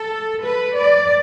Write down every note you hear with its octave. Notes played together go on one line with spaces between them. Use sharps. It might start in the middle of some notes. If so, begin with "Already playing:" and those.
Already playing: A4
B4
D5